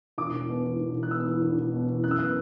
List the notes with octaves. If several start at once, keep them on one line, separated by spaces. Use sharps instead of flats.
E1 D6
E1
B2
E2
E1
E1
F#6
B2 E6
E2
E1
E1
B2
E2
F#2 F#6
E6
B3 F#6